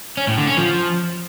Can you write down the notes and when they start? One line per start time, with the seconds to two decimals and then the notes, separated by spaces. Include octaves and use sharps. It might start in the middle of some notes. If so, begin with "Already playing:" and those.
0.17 C#4
0.27 A2
0.37 D3
0.47 C#4
0.57 F3